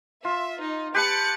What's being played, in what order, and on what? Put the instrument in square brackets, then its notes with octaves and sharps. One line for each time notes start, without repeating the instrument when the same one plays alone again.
[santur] F4 [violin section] E5
[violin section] D#4
[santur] G4 B4 A5 [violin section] F#6 A6 C#7